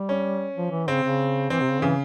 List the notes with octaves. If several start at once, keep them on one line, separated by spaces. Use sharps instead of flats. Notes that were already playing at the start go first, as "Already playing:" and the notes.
Already playing: G3
C#4
F3
E3
C#3 C4
C#3
E3 C4
C3
C#3
C#3 E3